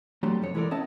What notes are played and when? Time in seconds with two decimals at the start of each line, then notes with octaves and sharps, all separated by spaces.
0.23 F#3 G3 A3 D4 C6
0.42 F2 D3 C#5
0.54 E3 G#3 E4 A4 A#4 D5
0.71 B3 C#4 D#5 E5 A5